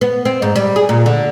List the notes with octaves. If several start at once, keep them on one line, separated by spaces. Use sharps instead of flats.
B3
C4
G#2
G3
G#4
A#2
D3